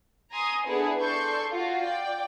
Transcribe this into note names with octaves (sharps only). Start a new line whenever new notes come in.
G#5 A#5 C6 D#6
B3 D4 E4 G#4 A4 B4
A4 D5 C6 C#6 G6
F4 F#4
D5 G5